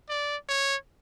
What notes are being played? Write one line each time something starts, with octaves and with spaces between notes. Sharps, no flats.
D5
C#5